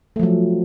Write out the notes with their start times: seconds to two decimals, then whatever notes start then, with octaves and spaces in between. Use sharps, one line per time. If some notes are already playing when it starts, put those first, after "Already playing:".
0.16 A3
0.19 F3
0.23 F#3